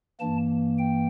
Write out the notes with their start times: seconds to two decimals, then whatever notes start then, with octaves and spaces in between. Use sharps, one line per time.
0.20 G2 E3 A#3 A5
0.79 G5